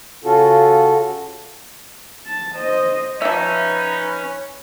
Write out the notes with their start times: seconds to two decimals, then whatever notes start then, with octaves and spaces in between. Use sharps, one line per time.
0.25 C#3 C#4 F4 F#4 A4
2.26 A5
2.55 C5 D#5
3.22 F3 C#4 D#4 B4 E5